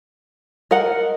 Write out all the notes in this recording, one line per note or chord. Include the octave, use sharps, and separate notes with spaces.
A#4 D#5 F#5